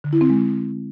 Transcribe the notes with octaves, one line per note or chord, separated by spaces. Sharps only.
D3
E4
C4
G#3